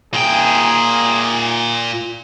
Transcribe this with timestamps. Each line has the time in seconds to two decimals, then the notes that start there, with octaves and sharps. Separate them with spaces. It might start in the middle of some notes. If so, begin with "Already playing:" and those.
0.14 A#2 G#4 G5